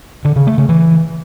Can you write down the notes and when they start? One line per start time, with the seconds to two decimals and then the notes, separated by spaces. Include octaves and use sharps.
0.25 D3
0.36 C#3
0.47 A3
0.58 C#3
0.69 E3